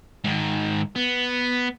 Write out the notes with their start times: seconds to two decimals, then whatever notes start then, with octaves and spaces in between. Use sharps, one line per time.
0.24 G#2 D#3
0.96 B3